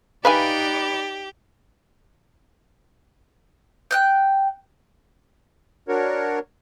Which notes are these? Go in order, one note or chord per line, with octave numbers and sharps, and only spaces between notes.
D#4 G4 B4 D5 E5 F5 G#5
G5 F#6 G6
D4 F#4 A#4 C#5